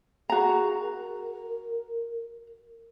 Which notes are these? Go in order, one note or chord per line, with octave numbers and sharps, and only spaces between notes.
F#4 G#4 A#5
A#4